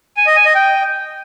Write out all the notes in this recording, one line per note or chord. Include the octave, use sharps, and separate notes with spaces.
G#5
D#5
G#5
D#5
G5